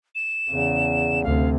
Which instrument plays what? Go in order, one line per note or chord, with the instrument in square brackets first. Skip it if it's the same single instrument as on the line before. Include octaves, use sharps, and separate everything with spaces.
[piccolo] E7
[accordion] E2 [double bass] C#3
[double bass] D2 C3 [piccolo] F5